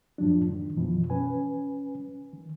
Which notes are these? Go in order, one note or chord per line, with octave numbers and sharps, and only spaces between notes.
F#2 A2 F3 F#3 D4
D#3
F#2 B2 E3 F3
C#4 B4 G#5
D#3